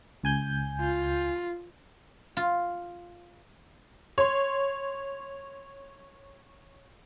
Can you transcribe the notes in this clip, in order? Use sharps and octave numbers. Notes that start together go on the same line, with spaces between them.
C#2 G#5 G6
F4
F4
C#5 C6